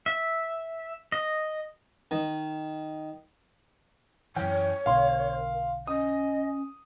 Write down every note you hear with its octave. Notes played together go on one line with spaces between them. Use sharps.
E5
D#5
D#3
F#2 E3 C#5 G5
B1 B2 D3 A#4 F5 C6
C#4 D#5 D#6